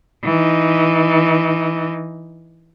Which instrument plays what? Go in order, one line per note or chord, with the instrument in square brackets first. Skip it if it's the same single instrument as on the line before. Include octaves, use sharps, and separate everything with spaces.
[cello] E3 D#4